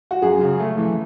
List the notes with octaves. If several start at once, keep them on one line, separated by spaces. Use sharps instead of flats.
F#4
F#2 G#4
C#3
A3
E3